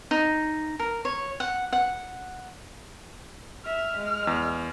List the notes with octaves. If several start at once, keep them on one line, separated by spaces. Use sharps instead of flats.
D#4
A#4
C#5
F#5
F#5
E5 F6
G#3
E2